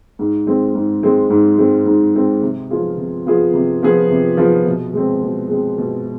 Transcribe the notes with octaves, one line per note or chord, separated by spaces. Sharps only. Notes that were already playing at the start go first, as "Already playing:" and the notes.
G#2
G#3 C4
G#2
G#3 C4
G#2
G#3 C4
G#2
G#3 C4
C3
F3 B3 F4 G#4
C3
F3 B3 F4 G#4
C3
F3 B3 F4 G#4
C3
F3 B3 F4 G#4
B2
G#3 C4
B2
G#3 C4
B2